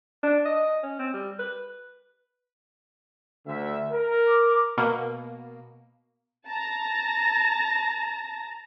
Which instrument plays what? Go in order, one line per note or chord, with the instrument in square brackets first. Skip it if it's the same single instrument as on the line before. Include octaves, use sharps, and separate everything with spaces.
[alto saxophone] D4
D#5
C#4
C4
G3
B4
[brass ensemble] D2 E5
A#4
[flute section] D6
[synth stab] B2 A#3
[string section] A5 A#5 A#6